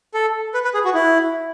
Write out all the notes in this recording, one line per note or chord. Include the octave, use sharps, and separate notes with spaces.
A4
B4
B4
G#4
F#4
E4